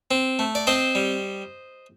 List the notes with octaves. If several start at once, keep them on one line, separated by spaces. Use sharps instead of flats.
C4
A3
D5
C4 C5 D#5
G3